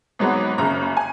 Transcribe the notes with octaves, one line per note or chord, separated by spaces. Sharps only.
G#1 G#2 F#3 B3
F#1 F#2 C#3 A#5
G#5